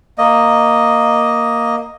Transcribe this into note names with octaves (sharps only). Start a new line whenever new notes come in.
A#3 D#5